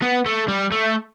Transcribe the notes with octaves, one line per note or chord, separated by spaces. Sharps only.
B3
A3
G3
A3